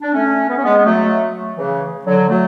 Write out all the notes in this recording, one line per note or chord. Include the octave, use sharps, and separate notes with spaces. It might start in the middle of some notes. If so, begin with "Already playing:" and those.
D4
A3 C#4
B3
C#4
G#3 B3
B3
F#3 A3
C#3 E3
D3 F#3
F#3 A3